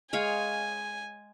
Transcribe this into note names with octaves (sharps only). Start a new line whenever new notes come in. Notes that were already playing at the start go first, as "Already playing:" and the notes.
G#3 C#5 F5 G#5